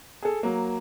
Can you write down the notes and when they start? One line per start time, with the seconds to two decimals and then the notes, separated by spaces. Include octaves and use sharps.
0.22 G#4 A4
0.43 F#3 A#3